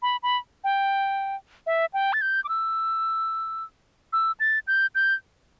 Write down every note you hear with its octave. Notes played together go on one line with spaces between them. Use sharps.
B5
B5
G5
E5
G5
A6
G6
D6
E6
E6
A6
G6
G6